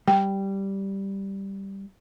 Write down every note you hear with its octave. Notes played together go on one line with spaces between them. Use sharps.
G3 G5